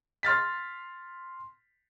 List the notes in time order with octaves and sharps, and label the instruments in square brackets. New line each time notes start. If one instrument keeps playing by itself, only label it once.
[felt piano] C6 F6 A6 B6